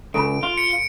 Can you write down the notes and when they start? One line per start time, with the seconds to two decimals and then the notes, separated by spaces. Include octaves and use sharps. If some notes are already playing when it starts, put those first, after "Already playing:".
0.14 C#2 A4 A5 B5 D7
0.43 F4
0.57 C#7